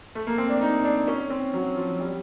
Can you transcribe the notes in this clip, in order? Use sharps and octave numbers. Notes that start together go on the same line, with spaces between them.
A3
A#3
C4
D4
D#4
D4
C#4
C4
F#3
F3
G3